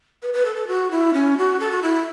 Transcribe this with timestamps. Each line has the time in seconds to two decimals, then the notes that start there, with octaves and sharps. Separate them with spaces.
0.22 B4
0.33 B4
0.45 A4
0.55 A4
0.67 F#4
0.91 E4
1.13 C#4
1.37 F#4
1.60 A4
1.71 F#4
1.82 E4